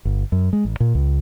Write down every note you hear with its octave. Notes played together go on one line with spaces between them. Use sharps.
G1
F#2
G#3
A1
A#2
C#2